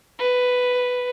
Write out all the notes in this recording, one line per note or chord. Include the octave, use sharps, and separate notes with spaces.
B4